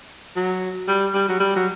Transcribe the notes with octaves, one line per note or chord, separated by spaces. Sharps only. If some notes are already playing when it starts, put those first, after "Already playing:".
F#3
G3
G3
F#3
G3
F#3